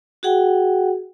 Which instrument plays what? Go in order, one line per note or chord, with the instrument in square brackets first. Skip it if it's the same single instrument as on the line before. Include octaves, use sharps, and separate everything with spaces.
[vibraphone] F#4 G#4 F#5 G5